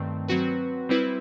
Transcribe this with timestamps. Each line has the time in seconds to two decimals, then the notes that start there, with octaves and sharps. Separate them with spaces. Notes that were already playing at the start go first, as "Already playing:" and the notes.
Already playing: G2 D#3 A3 C4
0.28 F#3 C4 F#4 B4
0.89 G3 C4 E4 B4